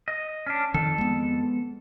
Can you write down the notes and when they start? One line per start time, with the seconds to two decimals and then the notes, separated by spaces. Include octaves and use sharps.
0.08 D#5
0.46 C#4 D4
0.74 F2 D#3 A4
0.98 G#3 B3